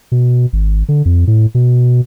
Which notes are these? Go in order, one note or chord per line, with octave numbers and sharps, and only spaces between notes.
B2
G#1
D3
F2
A2
B2